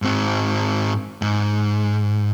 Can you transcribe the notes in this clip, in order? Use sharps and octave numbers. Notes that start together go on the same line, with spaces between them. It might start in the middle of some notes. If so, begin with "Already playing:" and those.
G#2 C4
G#2